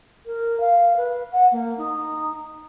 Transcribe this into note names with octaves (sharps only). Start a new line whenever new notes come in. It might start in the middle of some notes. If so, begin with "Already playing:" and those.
A#4
F5
B4
F#5
A#3
D#4